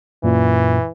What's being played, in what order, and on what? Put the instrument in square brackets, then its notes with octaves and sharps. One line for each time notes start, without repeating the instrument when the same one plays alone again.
[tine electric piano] F#2 A#2 [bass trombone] E3